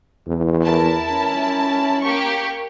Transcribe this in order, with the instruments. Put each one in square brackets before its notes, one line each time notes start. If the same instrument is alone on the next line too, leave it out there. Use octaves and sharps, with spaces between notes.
[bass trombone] E2
[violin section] E4 A#4 A5
[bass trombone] C#4
[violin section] A#3 G4 C#6